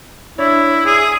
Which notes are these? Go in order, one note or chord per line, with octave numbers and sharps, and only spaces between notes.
D4 E4 C#5
G#4 E6